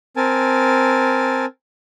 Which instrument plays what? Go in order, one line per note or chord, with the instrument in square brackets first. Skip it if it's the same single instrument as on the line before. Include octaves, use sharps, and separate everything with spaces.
[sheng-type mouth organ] C4 A#4 G#5 A5